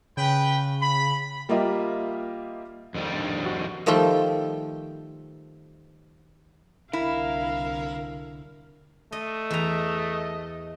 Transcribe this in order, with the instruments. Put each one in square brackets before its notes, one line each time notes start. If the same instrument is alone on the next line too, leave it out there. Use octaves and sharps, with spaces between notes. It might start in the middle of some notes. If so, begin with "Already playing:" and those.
[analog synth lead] C#3 [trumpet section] B4 G5 B5
[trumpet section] B5
[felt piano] G3 A#3 F4 G4 D#5 E5
[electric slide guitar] F2 D#3 G3
[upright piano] D4 D#4
F#4
[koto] D#3 F3 G3 A3 A4 G5
[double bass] C2 D3 [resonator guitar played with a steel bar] E4 [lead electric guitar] A#4 [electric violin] F5
[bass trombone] A3 [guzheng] D#5
[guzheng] E2 A#5 [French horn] D#5